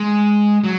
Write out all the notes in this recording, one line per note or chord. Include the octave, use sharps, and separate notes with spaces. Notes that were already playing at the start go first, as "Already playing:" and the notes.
Already playing: G#3
F#3